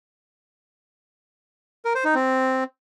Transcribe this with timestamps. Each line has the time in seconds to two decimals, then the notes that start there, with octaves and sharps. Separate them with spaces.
1.85 A#4
1.95 C5
2.05 D#4
2.15 C4